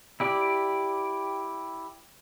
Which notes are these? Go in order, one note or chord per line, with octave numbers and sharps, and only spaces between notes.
E4 G4 D5